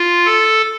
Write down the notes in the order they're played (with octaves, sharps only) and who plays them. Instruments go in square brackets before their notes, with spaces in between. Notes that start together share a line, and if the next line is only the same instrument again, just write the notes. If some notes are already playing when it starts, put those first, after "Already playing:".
Already playing: [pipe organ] F4
A4